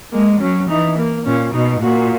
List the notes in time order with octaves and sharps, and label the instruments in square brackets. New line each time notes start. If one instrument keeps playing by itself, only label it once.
[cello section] G#3 [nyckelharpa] A#3
[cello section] F#3 [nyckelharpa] C#4
[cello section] E3 [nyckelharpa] D#4
[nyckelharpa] A#3
[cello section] A#2 [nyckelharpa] C#4
[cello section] B2 [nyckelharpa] D#4
[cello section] A#2 [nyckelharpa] F#4